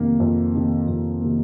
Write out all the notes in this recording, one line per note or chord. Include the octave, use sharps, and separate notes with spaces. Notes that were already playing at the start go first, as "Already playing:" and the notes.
Already playing: F2 C3 D#3 A#3
F2
C3 D#3 A#3
F2
C3 D#3 A#3